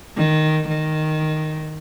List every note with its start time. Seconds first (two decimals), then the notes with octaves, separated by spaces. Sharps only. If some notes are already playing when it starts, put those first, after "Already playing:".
0.17 D#3
0.68 D#3